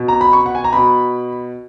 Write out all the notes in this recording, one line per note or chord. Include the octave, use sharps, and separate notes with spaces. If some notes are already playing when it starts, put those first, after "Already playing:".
Already playing: B2
A#5
B5
C#6
F#5
G#5
A#5
B2 B5